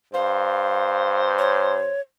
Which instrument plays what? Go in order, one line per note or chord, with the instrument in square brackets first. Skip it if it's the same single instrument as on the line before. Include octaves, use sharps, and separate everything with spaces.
[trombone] G2 [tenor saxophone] C5 [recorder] F5
[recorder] C#5